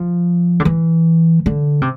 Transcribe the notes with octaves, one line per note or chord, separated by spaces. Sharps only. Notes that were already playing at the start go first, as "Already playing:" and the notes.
Already playing: F3
D3
E3
D3
C3